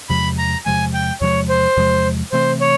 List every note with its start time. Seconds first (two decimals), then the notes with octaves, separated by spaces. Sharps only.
0.09 E2 C3 F3 G#3 B5
0.38 A#5
0.65 E2 C3 F3 G#3 G#5
0.94 G5
1.21 E2 C3 F3 G#3 C#5
1.49 C5
1.77 E2 C3 F3 G#3
2.32 C3 E3 A3 C4 C5
2.61 C#5